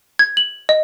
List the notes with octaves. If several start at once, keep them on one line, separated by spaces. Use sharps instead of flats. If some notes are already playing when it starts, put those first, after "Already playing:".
G#6
F#7
D#5